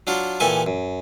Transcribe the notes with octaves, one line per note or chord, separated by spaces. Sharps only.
F#3 D4 F4 F#4
A#2 E3 G4 A4 G#5 A5
F#2